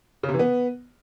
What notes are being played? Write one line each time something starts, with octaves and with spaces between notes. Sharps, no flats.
C#3
C3
E3
B3